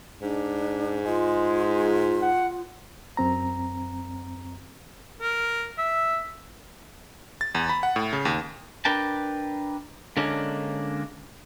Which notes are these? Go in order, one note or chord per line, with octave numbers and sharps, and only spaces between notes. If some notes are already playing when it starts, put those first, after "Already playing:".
G#2 D4
G#3 F4
F#5
F#2 C4 A#5
A#4
E5
A6
E2
B5
F#5
A2
C#3
D#2
D4 A#4 B4 G5 A5
D3 G#3 A#3 C#4 D4